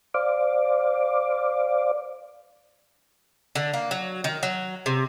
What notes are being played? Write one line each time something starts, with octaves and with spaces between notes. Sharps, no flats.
C5 D5 F5 D6
D3
A#3
F#3
D#3
F#3
C3